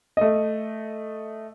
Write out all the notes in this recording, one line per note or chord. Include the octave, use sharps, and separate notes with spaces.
A3 D#5